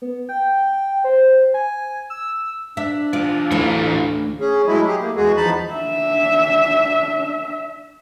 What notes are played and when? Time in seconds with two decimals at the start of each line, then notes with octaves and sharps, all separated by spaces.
0.02 B3
0.29 G5
1.04 C5
1.54 G#5
2.10 E6
2.77 D4 E5
3.13 E2 F4 D5
3.51 D2 E3 A3 C#5
4.40 C#4 G#4
4.67 F#3 G#3 A3 E4
4.87 G4 G#4
5.01 A3 A#3
5.16 E2 G#3 F#4 G#4
5.37 E2 F3 D#4 A5 B5
5.73 D4 E5